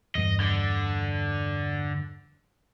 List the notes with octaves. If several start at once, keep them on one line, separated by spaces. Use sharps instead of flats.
E2 G2 D#5
D3